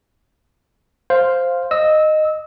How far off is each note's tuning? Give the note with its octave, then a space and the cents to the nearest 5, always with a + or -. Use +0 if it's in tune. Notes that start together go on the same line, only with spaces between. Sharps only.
C5 +0 F5 +0
D#5 -10 E6 -25